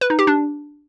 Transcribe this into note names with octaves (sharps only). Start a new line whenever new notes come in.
B4
D#4
G4
D4